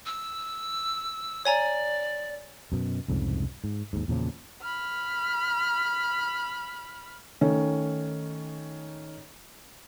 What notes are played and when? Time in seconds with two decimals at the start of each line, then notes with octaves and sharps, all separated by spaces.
0.06 E6
1.45 C#5 D5 G#5 A#5
2.72 F#2 B2
3.08 C2 F2 G#2 C#3
3.64 G#2
3.93 D#2 G#2
4.08 E2 A#2 C#3 F3
4.62 B5 F6
7.41 D#3 A3 C#4